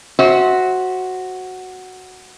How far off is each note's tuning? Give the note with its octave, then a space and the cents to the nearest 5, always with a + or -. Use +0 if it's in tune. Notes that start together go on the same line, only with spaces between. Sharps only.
F#4 +0 C5 +10 E5 -25